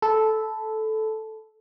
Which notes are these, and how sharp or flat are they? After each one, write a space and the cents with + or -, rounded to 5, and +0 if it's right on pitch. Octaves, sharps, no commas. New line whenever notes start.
A4 -10 B5 +20